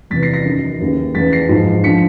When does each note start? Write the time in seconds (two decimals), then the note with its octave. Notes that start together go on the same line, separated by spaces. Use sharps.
0.10 E2 C3 E3 A6 B6
0.22 A#6 C7
0.33 A#6 C7
0.46 F#2 D#3
0.80 D#2 C#3 E3
1.15 E2 C#3 E3 A6 B6
1.32 A#6 C7
1.49 G#2 F3
1.84 D3 F3 B6 C#7